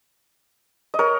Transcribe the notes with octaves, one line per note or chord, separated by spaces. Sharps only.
D#5
A#4 C#5